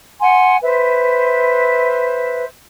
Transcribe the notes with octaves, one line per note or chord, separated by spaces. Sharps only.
F#5 G#5 C6
B4 C5 E5